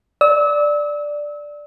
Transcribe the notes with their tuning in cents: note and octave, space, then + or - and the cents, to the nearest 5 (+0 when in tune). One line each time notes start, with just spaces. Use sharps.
D5 +0 E6 -35